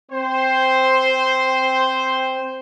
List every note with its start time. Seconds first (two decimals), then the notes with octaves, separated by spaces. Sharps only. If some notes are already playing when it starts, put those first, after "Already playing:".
0.11 C4 C5